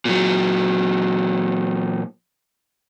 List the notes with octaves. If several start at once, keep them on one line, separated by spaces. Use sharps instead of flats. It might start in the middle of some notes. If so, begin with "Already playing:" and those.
A#2 F#3